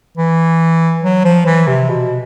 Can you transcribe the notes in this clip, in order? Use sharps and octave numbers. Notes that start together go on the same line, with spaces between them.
E3
F#3
F3
E3
C3
B2